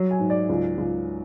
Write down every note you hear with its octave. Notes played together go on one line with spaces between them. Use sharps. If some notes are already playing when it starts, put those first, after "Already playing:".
Already playing: F#3
G#5
G#2
D5
C#2
C#2